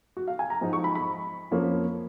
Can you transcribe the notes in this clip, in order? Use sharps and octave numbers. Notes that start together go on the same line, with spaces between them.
F#4
F5
G#5
A#5
G#2 F3 G#3 D#4
C#6
B5
B5
F2 F3 A#3 C#4